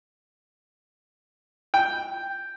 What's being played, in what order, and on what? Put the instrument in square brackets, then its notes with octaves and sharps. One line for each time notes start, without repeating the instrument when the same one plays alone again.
[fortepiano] G5